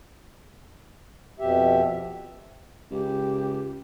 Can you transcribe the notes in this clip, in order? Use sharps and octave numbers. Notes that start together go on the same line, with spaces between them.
F2 B2 G4 E5
C#2 G4